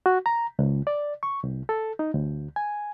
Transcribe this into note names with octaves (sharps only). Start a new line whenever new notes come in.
F#4
A#5
C#2
D5
C#6
C2
A4
D#4
D2
G#5